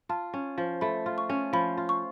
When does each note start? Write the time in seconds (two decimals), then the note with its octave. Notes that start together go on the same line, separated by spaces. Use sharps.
0.09 F4 A5
0.34 C#4
0.58 F3
0.81 A3 B5
1.06 F4
1.18 C#6
1.29 C#4
1.53 F3 B5
1.77 F4
1.89 C#6